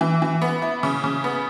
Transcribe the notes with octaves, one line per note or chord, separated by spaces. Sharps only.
E3
E3
B3
E4
C#3
C#3
B3